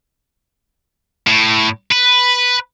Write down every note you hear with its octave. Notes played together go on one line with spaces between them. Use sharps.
A2
B4